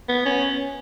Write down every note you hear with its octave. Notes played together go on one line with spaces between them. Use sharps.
B3
C#4